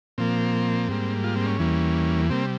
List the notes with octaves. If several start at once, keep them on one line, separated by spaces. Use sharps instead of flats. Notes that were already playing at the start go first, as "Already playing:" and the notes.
A#2 F3 A#3 C4
G#2 G3 A#3
F4
C4
C#4
E2 E3 G3 A#3
C3 G3 A#3 C4